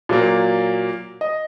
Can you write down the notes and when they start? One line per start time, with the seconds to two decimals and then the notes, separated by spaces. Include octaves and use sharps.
0.09 A#2 F#3 A#3
1.21 D#5